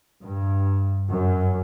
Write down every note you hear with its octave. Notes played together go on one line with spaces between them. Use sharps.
G2
F#2